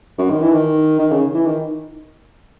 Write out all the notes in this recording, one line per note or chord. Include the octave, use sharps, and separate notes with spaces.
F#2
D#3
E3
D#3
D#3
C#3
E3
D#3